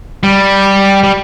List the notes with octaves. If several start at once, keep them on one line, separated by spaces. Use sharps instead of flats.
G3
G3